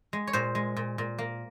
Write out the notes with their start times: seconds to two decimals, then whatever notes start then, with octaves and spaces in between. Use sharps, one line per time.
0.13 G#3
0.27 C#5
0.33 A#2 C5
0.55 G#3
0.76 A#2
0.98 A#2
1.19 A#3